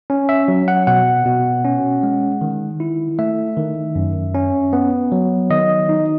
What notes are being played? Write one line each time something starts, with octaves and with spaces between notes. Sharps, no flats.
C#4
E5
F#3
F#5
B2 F#5
B2
C#4
G#3
D#3
E4
A3 E5
D#3
F#2
C#4
B3
F#3
D#3 D#5
D#4